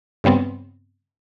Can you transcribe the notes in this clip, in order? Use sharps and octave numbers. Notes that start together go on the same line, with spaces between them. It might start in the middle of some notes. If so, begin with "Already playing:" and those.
G2 C#3 G3 B3 C4